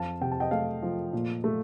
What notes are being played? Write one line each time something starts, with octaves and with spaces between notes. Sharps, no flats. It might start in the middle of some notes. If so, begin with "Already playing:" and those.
Already playing: F2 F5 A5
C3 G5
A5
D#5 G5
A3 F5 A5
F3
A#2
A3